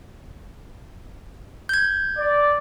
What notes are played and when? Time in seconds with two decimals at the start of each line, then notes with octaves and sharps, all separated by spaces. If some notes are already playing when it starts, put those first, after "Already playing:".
1.69 G6 G#6
2.18 D5